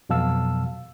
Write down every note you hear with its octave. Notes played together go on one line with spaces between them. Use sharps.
F2 B2 F#3 F5 A5 E6